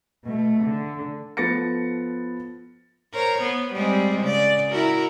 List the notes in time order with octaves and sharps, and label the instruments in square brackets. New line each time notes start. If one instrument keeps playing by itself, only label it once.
[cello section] B2 A3
D3
[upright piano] F3 B3 A4 A6 A#6 C#7
[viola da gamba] A#4 C5 C#5
B3
G3 G#3 C4
C#3 D5
E4 F#4 A#4